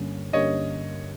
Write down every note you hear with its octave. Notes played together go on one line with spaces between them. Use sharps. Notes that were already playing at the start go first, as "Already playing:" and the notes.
Already playing: G2 D3 G3 A#3 C#4
G2 D3 G3 A#3 C#4 C#5 D#5